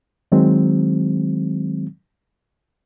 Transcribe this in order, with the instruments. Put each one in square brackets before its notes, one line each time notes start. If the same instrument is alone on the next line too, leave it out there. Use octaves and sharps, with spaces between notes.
[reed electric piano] D#3 F#3 G#3 C4